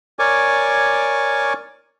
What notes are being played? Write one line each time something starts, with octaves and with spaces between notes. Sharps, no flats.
A#4 C#5 D5 G#5 C#6 D6